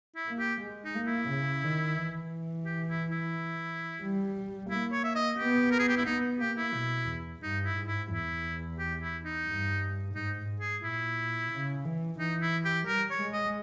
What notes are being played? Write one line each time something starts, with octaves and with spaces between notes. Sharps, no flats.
E4
A#3
G4
G#3
D#4
A#3
E4
C#3
D#3
E3
G4
E4
E4
G3
A#3 E4
C#5
E5
D#5
B3 G4
A#4
G#4
G4
E4
B3 D#4
A#3 G4
E4
B2
E2
G2 D#4
E4
G#2
E4
E2 E4
G4
E4
D#4
G2
G#2 D#4
G#2
G#4
A#2 E4
C#3
E3
E3 D#4
E4
G4
G3 A#4
C#5
G#3
D#5